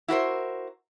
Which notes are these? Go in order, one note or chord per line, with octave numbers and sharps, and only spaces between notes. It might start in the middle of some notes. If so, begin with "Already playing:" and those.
E4 F#4 A#4 C5